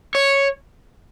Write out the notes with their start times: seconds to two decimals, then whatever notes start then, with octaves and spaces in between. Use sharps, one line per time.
0.15 C#5